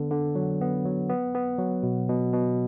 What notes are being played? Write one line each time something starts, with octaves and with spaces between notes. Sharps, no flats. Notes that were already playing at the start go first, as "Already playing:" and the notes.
Already playing: D3 B3
D3
F#3
B3
F#3
B3
B3
F#3
B2
B2
B2